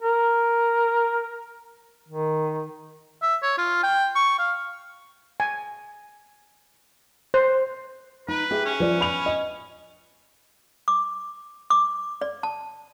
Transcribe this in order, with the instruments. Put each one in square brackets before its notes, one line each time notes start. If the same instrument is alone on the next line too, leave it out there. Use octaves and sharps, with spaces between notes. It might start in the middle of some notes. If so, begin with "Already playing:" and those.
[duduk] A#4
D#3
[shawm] E5
C#5
F4
G5
C#6
F5
[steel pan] G#5
C5
[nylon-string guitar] D#4 [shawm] B4
[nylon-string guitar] G4 G#4 E5
[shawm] C#4
[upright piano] F3 D5 [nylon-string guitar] B4
[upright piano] B5 F7
D#5
[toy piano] D6
D6
D5
A5